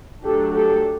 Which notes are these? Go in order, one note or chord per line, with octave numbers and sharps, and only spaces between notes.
F#3 A3 D4 G4 A4
G4 A4